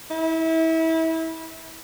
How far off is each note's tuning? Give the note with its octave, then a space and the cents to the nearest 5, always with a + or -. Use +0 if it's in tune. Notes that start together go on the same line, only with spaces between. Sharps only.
E4 -30